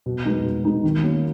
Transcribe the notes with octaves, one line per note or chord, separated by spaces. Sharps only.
B2
G#3 B3 D#4
B2
G#3 B3 D#4
D#3
F#3 A#3 C#4